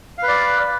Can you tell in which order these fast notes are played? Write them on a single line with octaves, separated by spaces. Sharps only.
F5 B4 D5